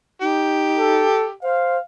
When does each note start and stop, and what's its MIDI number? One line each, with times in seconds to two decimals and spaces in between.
0.22 1.05 63
0.22 1.32 67
0.77 1.28 69
1.43 1.78 72
1.43 1.79 77